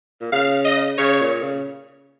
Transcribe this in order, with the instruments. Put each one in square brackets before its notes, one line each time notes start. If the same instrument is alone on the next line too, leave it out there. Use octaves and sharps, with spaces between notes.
[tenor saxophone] A#2
[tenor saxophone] C#3 [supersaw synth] F5
[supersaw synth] D#5
[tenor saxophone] C#3 [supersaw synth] C#5
[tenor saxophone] A#2
C#3